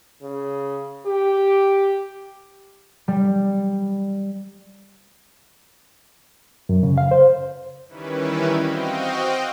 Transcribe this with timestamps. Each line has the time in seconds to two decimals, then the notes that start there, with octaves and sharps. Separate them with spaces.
0.23 C#3
1.06 G4
3.08 G3
6.69 F#2
6.83 C#3
6.98 F5
7.11 C5
7.88 D#3 E3 G3 C#4 E4 B4
8.55 C4 F#4 D#5 F5 G5